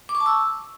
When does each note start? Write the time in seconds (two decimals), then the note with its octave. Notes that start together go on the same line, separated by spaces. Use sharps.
0.09 D6
0.15 C#6
0.20 A5
0.26 E6